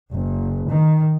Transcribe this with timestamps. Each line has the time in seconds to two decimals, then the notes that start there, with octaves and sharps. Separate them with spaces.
0.12 F#1
0.69 D#3